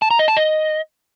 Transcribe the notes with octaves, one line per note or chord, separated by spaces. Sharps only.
A5
A#5
D#5
A5
D#5